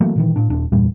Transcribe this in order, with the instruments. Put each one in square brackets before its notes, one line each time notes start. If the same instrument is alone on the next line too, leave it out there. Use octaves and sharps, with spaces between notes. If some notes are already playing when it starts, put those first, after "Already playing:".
[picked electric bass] E3 F#3 A3 A#3
A#2 D#3 E3
A2 D4
D#1 D4
E2 G2 A#2 G3